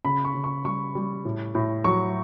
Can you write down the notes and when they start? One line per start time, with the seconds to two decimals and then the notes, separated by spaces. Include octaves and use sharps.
0.04 C#3 B5
0.25 C#6
0.34 C#3
0.44 C#6
0.65 G3 C#6
0.95 G3
1.25 A2
1.55 A2
1.84 F#3 C#6